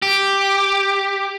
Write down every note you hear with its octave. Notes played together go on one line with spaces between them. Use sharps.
G4